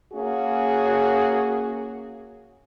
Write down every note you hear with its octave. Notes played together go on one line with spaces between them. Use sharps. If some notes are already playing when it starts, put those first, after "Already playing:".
A#3 C#4 F#4 G#4